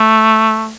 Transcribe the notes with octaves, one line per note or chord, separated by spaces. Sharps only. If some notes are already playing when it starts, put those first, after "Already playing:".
Already playing: A3